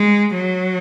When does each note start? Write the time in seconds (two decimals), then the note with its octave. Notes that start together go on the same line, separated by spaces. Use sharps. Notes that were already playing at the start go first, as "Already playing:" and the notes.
Already playing: G#3
0.34 F#3